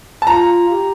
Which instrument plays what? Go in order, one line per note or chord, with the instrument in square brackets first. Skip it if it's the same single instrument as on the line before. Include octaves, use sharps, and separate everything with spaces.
[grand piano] A5
[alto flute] F4 [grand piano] A#5
[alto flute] G4